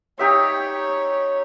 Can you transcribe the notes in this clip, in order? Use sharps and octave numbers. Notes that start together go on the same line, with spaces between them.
D#4 G4 C#5 E5